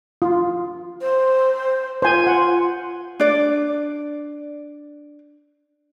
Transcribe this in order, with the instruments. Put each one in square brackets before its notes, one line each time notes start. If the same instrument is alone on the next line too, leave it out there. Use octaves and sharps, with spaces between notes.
[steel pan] F4
[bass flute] C5
[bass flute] F4 [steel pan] C5 G#5
[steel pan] F#5
[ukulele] D4 D5